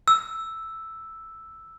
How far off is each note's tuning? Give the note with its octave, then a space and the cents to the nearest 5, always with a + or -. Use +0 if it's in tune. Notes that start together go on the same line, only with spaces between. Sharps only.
E6 +0